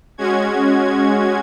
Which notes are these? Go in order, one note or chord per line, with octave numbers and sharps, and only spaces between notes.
G#3 C#4 F#4 G#6